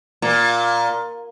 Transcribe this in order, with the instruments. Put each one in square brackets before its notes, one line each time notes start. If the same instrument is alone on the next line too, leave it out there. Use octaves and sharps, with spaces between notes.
[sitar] A#2